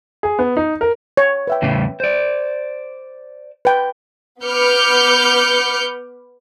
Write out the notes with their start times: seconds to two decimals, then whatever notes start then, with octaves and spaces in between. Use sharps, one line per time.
0.23 G#4
0.39 B3
0.57 D#4
0.81 A#4
1.17 C#5
1.47 B4 E5 G5
1.62 E2 A2 C#3
2.00 C5 D5
3.65 B4 G5
4.44 B3 B4 D6 F6 G6 C#7